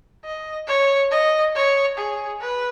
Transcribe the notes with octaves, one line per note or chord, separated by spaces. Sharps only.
D#5
C#5
D#5
C#5
G#4
B4